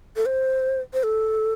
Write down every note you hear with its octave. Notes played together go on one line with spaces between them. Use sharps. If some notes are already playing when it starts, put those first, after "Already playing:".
A4
C5
C5
A4